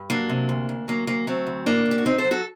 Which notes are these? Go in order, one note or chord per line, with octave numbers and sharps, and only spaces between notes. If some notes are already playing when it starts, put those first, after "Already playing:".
Already playing: G2
F#3 A#3 D4
C3
D2
D2
F#3 A#3
D2 A#3
F#3 A3 C4
D2
A2 A#3 D4
A2
G4
F#4
F#3 C4 D#4
A4 C5
F#3
F#4 A4